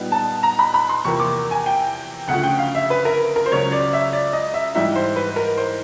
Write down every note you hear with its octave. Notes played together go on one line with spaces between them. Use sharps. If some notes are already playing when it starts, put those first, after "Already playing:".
Already playing: A#2 G3 B3 D#4
A5
A#5
B5
B5
C6
E2 C3 F3 A#3 C#6
D6
G#5
G5
D2 C#3 F3 A3 F#5
G5
F5
E5
B4
A#4
A#4
C5
C#2 C#3 F#3 C#5
D5
E5
D5
D#5
E5
G#2 E3 G3 E5
C5
B4
A#4
C5